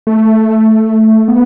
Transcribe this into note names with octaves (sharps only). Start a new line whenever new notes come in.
A3
B3